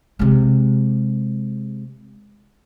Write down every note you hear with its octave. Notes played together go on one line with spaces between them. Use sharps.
C3 G#3